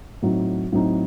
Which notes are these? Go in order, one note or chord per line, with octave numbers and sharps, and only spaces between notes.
A2 F#3 C4 D#4
A2 F#3 C4 D#4